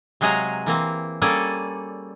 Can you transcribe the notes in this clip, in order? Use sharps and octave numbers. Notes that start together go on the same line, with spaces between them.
C3 F#3 G#3 G#4 F5 A#5
E3 A#3 C4
G3 A#3 C#4 G#4 A4 D5